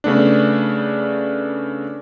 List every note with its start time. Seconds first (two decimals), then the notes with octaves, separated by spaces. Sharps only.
0.04 C#3 A3 B3 D4